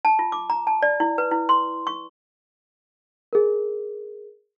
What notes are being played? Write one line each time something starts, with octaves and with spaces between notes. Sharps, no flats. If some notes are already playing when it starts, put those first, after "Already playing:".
A5
F4
D6
A#5
A5
D5
E4
B4
E4
C6
C#6
G#4 A#4